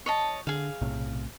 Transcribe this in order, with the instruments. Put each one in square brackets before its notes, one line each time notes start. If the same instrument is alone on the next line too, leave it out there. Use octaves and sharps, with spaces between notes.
[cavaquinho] C#5 D#5 A5
[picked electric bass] D3 [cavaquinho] G#4 F5
[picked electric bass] B1 A2 C3